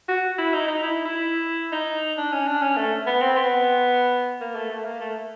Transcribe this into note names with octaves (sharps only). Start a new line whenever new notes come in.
F#4
E4
D#4
D#4
E4
E4
D#4
D4
C#4
D4
C#4
A3
B3
C4
B3
A#3
A3
A3
A#3
A3